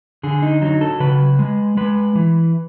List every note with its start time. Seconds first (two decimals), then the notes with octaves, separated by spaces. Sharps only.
0.23 D3 G#4
0.42 D#4
0.62 F#3 D#4
0.81 A4
1.00 C#3 B4
1.39 G#3
1.77 G#3 B4
2.15 E3